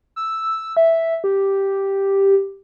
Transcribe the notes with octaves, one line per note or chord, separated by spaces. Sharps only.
E6
E5
G4